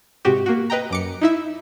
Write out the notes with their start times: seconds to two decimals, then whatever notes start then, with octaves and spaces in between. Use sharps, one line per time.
0.25 G#2 C3 F#4 G4
0.46 A#3 F#4
0.70 B4 D#5 G5 A#5
0.90 F#2 D6 C#7
1.21 D#4 E4 E5